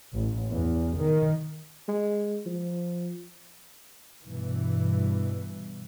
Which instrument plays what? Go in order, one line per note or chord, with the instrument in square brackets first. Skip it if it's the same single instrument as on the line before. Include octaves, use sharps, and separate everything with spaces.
[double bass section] A1
E2
D#3
[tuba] G#3
F3
[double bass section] G2 B2 E3